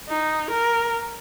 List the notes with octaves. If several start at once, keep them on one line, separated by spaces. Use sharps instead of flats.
D#4
A#4